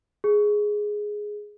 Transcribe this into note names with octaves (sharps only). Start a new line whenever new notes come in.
G#4